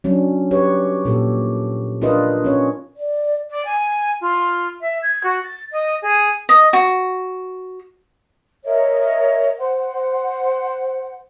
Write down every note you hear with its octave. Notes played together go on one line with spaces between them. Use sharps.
F#3 C#4 D4
G4 B4 C#5
A#2 G4 A4
D4 D#4 F4 A#4 B4 D#5
C#4 C#5
D5
D5
G#5
F4
E5
G#6
F#4
A6
D#5
G#4
D#5
F#4
A#4 C#5 D#5 E5
C5 F#5